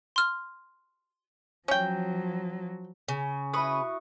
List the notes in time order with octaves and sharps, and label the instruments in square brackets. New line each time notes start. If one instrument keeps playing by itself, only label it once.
[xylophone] C6 F6
[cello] F3 F#3 [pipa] C#4 G5
[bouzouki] C#3
[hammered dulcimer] E4 F#4 [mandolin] B4 [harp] C#6 D#6